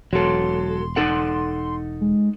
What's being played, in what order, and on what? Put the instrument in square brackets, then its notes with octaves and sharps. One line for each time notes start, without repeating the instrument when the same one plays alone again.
[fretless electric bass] E1 [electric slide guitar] F#3 A4 [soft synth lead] C6
[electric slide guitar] D#4 A4 F#5
[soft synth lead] G#3